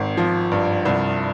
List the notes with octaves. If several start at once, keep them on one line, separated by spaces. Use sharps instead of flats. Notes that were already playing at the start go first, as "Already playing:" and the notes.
Already playing: G#1 C4
F3
G2
C2